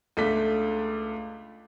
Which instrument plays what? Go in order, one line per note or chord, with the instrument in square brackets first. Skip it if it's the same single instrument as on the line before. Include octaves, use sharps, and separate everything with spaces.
[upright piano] C#2 A3 D4 B6